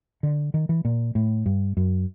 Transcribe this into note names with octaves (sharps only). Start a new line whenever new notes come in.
D3
D#3
E3
A#2
A2
G2
F#2